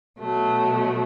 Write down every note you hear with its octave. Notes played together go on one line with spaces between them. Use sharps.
B2 F#3 A3